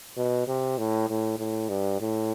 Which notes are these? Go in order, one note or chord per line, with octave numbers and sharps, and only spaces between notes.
B2
C3
A2
A2
A2
G2
A2